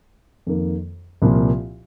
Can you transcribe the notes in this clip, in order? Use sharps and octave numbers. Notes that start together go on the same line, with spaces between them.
F2 D#3 A#3
C2 A#2 F3 A#3 F4